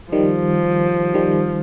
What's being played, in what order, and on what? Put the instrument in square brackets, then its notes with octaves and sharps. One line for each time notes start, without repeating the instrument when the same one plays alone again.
[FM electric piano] D#3 G3 [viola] F3
[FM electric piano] D#3 G3